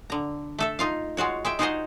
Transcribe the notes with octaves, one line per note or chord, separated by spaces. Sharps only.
D3 A#5
A3 A4 E5
D#4 F4 F5
G#3 F4 F#4 C#5
G#3 E5 G5
D#4 F4 F#4 G#4 C5 D#5